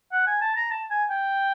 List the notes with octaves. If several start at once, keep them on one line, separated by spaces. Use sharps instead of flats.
F#5
G#5
A5
A#5
A5
G#5
G5